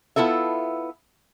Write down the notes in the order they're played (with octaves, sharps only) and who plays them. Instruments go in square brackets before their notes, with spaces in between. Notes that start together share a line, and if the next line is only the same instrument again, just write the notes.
[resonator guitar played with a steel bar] B3 E4 F4 A4 E5